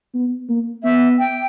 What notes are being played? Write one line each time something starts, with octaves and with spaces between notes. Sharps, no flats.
B3
A#3
B3 E5
G5